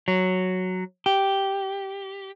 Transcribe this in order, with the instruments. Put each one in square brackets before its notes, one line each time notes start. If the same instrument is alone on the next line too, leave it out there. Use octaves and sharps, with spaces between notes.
[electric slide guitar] F#3
G4